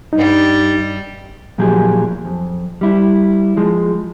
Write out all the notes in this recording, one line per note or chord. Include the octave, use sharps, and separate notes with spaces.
G2 G3 D#4
A#2 F3 F#3 G4 G#4
F2
G3 E4
F3 G#3